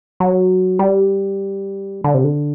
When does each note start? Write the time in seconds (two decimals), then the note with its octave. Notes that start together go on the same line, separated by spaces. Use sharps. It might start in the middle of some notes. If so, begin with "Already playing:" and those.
0.20 F#3
0.79 G3
2.04 D3
2.14 C3
2.24 D3